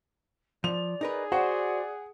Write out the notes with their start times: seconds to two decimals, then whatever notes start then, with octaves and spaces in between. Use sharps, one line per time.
0.64 F3 D5 F7
1.01 D#4 G#4 A#4 B4
1.32 F#4 C5 D5 F#5